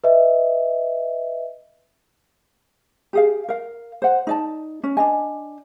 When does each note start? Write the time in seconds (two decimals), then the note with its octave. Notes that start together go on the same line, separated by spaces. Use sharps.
0.04 B4 D#5 E5
3.13 G4 G#4 F5
3.49 A#4 F5
4.02 C5 F#5
4.27 D#4 D5 A5
4.83 C#4
4.97 D4 D5 D#5 G#5